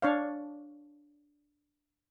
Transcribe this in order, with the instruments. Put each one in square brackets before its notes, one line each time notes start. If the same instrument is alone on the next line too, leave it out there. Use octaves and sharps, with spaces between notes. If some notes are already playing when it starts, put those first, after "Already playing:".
[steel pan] D4 C#5 F5